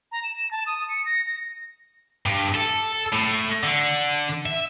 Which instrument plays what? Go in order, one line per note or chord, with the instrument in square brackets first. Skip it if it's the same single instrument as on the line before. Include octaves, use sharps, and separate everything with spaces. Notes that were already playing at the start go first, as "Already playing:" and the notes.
[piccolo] A#5
E7
A5
D#6
C#7
A#6
A#6
[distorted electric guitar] G2
A4
A2
D3
E5